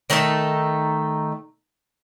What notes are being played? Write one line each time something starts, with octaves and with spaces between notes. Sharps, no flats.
D#3 A3 D#4 A4